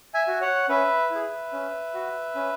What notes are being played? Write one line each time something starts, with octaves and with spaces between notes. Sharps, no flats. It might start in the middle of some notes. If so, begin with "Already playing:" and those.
E5 G#5
F#4
C#5 F#5
C#4 B4 E5
E4 G#4
C#4
F#4
C#4